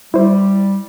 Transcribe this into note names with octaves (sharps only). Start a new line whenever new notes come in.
G3 E4 C5